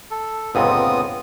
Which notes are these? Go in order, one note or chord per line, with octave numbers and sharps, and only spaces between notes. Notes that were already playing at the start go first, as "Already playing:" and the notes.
A4
G1 C#2 A#2 B3 C4 D#6